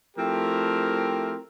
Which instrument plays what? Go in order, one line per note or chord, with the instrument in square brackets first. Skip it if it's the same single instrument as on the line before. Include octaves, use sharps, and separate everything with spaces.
[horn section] F3 A3 C4 E4 G4 A#4